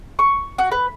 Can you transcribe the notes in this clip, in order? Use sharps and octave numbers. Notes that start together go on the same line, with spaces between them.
C#6
F#4
B4